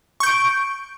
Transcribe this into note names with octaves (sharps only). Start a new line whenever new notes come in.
C#6 G6 D7